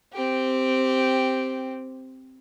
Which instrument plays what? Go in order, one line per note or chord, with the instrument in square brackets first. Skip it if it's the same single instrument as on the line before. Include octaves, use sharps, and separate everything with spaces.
[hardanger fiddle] C4 G4